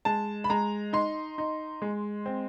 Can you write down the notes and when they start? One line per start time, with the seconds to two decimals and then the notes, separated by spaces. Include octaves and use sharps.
0.05 G#3 A5
0.44 B5
0.50 G#3 A#5
0.93 D#4 C6
1.38 D#4
1.82 G#3
2.26 C4